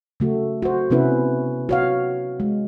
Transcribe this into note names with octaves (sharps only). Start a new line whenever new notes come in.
C#3 A3 F#4
F#4 C5
C3 B3 C#4 E4 B4
F#4 C#5 F5
G#3